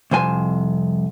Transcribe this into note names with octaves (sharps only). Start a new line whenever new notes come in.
C2 F2 C5 G#5